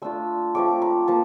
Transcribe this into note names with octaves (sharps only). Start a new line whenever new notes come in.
A3 D4 F4 E6
F3 A3 C4 D6
A#5
F3 A#3 A5